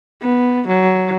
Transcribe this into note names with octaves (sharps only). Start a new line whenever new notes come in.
B3
F#3